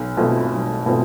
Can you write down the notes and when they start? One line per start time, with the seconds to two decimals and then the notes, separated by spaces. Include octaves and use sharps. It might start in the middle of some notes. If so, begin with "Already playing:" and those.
Already playing: B1
0.17 B2 A3 C4 F4
0.52 B1
0.86 B2 A3 C4 F4